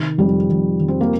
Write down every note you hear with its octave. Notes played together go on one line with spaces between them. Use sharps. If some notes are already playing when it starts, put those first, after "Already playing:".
Already playing: C3 D#3
F2 G3
F2
F2
C4
A#3